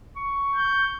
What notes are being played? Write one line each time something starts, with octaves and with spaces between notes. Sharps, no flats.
C#6
G6